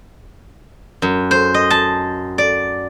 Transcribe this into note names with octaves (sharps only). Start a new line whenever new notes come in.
F#2
C5
D#5
A5
D5